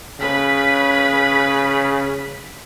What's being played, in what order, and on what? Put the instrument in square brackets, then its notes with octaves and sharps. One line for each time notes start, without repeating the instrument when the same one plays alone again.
[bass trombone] C#3 [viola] B4 B5